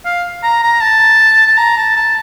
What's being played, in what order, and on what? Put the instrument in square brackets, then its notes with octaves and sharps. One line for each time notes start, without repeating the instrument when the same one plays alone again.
[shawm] F5
A#5
A#5
A5
A5
A#5
A5
A5